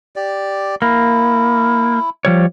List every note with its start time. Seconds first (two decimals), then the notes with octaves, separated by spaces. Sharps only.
0.16 G4 D5
0.82 A#3 E4
2.25 F3 G3 C#5